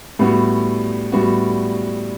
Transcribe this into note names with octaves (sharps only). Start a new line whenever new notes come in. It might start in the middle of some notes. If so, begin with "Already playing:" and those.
A2 G3 B3 F#4
A2 G3 B3 F#4